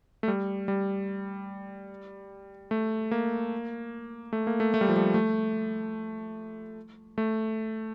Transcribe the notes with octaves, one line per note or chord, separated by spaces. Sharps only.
A3
G3
G3
A3
A#3
A3
A#3
A3
A3
G3
F3
G3
A3
A3